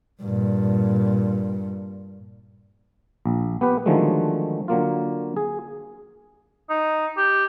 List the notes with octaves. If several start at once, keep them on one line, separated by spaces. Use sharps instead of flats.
G2 A#2
A#1
B3 G4 B4
D3 D#3 F3 F#3 G#3 A3
D3 F#3 A#3 F4
G#4
D#4
G4